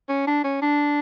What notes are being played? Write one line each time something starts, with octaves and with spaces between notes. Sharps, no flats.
C#4
D4
C#4
D4